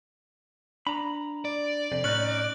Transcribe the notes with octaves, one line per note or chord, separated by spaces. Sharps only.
D4 A#5 B5
D5
F2 C3
A2 C#4 D#4 F#6 F#7